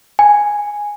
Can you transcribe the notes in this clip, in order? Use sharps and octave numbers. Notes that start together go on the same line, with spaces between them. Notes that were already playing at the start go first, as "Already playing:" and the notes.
G#5